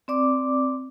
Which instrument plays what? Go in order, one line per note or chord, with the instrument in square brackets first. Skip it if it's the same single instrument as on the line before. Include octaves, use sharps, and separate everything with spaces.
[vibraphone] C4 D5 D6